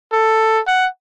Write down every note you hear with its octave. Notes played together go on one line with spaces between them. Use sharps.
A4
F#5